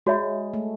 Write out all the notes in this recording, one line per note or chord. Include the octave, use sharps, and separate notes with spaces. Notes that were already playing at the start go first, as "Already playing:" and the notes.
G#3 F#4 C#5 E5 B5
A3